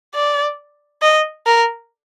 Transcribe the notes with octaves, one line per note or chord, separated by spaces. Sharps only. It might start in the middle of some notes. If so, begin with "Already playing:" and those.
D5
D#5
A#4